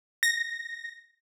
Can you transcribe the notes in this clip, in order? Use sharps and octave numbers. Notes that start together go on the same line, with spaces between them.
A#6